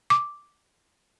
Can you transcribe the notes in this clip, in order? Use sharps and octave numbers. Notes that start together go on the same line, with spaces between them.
D6